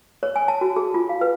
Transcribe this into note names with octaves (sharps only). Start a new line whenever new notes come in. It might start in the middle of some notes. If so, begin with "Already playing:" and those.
C#5
G#5
A5
F#4
G#4
F4
F5
B4